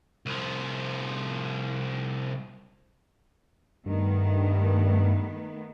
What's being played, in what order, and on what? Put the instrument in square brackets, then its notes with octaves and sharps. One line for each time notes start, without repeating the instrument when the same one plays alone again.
[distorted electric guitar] C2 F3
[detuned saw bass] G2 [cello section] D#3 A3 B3